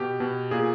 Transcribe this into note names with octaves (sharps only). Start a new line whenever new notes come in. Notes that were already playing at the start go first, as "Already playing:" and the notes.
Already playing: B2 G4
B2
A#2 G#4